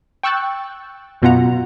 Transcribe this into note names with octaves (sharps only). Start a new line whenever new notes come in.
G5 C#6 E6 F#6 G6 A6
F#2 B2 B3 F4 F#5 A#5